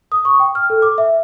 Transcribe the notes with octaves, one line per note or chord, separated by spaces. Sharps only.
D#6
C#6
G5
F6
A4
D6
E5